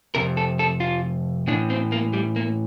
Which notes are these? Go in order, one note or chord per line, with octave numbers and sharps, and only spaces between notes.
F2 C3 A#4
A4
A4
F4
A2 E3 D4
C4
A#3
G3
A#3